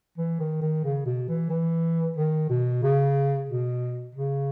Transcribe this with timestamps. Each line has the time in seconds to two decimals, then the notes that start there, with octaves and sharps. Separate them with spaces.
0.18 E3
0.40 D#3
0.62 D#3
0.84 C#3
1.06 B2
1.28 E3
1.50 E3
2.16 D#3
2.49 B2
2.83 C#3
3.49 B2
4.15 C#3